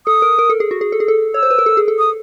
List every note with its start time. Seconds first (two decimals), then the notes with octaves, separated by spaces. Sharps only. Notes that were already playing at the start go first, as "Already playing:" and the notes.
0.06 A4 D#6
0.22 A#4
0.39 A#4
0.50 A4
0.60 G#4
0.71 F#4
0.81 G#4
0.92 A4
1.00 G#4
1.08 A4
1.34 C#5 E6
1.43 C5
1.50 B4
1.58 A#4
1.66 A4
1.77 G#4
1.88 A4
1.99 D#6